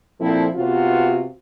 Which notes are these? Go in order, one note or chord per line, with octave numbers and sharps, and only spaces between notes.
A#2 F3 C4 E4 A4
C3 B3 F4 F#4